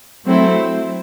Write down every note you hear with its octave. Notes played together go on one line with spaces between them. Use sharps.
F#3 A3 C4 E4